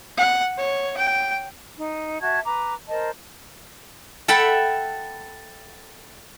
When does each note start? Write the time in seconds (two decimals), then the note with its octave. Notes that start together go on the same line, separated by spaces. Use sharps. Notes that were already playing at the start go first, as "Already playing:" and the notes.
0.17 F#5
0.58 C#5
0.98 G5
1.77 D#4
2.21 F#4 E5 A5 G#6
2.45 B4 A#5 D6
2.89 A#4 C5 D#5 A5
4.28 A4 E5 F#5 G5 A5 B5